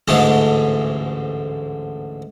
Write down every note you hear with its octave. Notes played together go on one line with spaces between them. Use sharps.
A1 D2 G#2 D3 G#3 A3